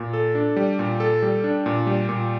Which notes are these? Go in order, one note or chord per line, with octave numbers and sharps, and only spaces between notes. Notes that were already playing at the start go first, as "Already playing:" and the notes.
Already playing: A#2
A4
D4
G3
A#2
A4
G3
D4
A#2
G3
A#2